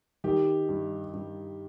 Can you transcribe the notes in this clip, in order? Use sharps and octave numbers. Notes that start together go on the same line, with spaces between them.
D#3 G4
G2
G2